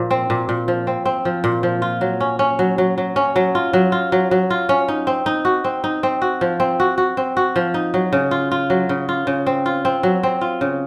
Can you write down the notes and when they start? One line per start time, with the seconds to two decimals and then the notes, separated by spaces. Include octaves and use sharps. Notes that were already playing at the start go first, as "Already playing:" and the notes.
Already playing: A#2 F3
0.11 C4
0.30 A#2
0.49 A#2
0.68 F3
0.87 C4
1.05 C4
1.25 F3
1.44 A#2
1.63 F3
1.82 F4
2.01 F#3
2.21 C#4
2.39 C#4
2.59 F#3
2.78 F#3
2.98 F#3
3.16 C#4
3.36 F#3
3.55 F4
3.73 F#3
3.92 F4
4.12 F#3
4.31 F#3
4.50 F4
4.69 C#4
4.88 D#4
5.07 C4
5.26 D#4
5.45 F#4
5.64 C4
5.84 D#4
6.03 C4
6.22 F#4
6.41 F3
6.60 C4
6.80 F#4
6.98 F#4
7.17 C4
7.37 F#4
7.56 F3
7.74 D#4
7.94 F#3
8.13 C#3
8.31 F4
8.51 F4
8.70 F#3
8.89 C#3
9.09 F4
9.27 C#3
9.47 C4
9.66 F4
9.85 C4
10.03 F#3
10.23 C4
10.41 F4
10.61 C#3